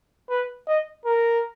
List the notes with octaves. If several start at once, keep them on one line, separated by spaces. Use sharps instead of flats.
B4
D#5
A#4